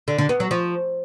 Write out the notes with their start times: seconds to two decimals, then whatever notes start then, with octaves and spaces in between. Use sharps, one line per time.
0.08 D3
0.18 D3
0.29 B3
0.40 F#3
0.51 F3